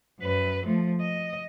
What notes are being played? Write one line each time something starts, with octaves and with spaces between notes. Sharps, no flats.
F#2 B4
F3 A3
D#5